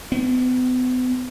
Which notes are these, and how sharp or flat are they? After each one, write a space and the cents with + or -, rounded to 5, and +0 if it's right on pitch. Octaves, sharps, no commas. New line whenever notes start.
B3 +40